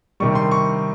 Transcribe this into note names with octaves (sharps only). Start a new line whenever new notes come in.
C3 D#3 G3 C#6
C6
C#6